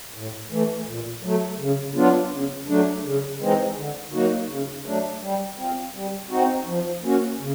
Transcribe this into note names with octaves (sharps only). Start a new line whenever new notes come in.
A2
E3 A3
A#2
F#3 A3
C#3
F#3 B3 D4 F4
C#3
F#3 A3 D4
C#3
E3 G#3 C4 D#4
D3
F#3 A#3 D#4 F#4
C#3
F#3 A3 D4
G3
C4 F4
G3
C4 D#4 F#4
F3
A#3 C#4 F#4
C#3